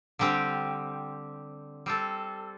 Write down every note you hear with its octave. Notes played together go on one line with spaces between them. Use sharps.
D3 G3 C4 G4
G3 C4 A4